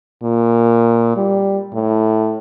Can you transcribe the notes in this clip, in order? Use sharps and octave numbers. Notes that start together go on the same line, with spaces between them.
A#2
G3
A2